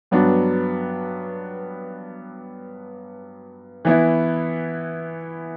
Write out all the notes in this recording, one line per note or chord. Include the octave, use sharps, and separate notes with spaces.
G2 F#3 B3 D4 F#4
E3 B3 E4